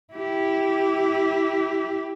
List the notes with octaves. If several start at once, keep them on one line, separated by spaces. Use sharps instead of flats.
E4 G4